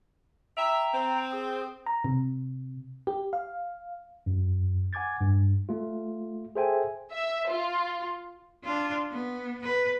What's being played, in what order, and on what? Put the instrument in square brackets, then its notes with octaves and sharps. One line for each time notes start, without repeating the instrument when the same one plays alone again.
[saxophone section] E5 [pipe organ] G5 A#5
[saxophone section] C4
[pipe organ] G#4
[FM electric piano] A#5
C3
G4
F5
[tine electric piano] F#2
F#5 G#5 D6 G#6 A6
G2
A3 F4
G#4 A4 C5 E5 G5 G#5
[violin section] E5
F4
[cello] D4 F4
B3
B4